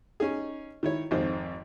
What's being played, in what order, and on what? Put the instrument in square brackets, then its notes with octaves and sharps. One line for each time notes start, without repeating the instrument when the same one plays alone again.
[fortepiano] C#4 D#4 G#4
D#3 E4 C#5
G#1 F2 D#3 C5